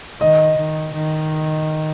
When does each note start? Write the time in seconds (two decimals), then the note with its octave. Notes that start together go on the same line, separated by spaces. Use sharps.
0.20 D#3 D#5
0.57 D#3
0.95 D#3